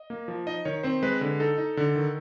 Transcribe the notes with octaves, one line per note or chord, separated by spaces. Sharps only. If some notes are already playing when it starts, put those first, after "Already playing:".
Already playing: D#5
A#3
F3
D#4 D#5
D#3 C#5
C4 C5
G#3 B4
D3 B4
D#4 A4
D#4
D3
D#3